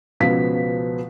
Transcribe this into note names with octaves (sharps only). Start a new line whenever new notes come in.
C#2 B2 F3 B6